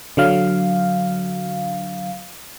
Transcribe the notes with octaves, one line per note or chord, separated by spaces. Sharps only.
D3 F#3 F5